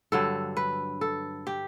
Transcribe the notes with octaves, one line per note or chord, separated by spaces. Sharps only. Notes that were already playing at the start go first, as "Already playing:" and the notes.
G2 D3 F#3 A4
B4
A4
G4